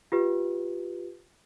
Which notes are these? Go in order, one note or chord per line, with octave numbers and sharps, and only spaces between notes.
F4 G4 B4